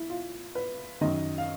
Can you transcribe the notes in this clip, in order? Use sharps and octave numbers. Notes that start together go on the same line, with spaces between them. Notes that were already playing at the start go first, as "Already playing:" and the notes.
Already playing: E4
F4
B4
F#2 D#3 D#5
F5